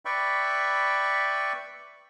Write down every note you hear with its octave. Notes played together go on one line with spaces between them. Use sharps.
B4 D5 E5 G5 B5 C#6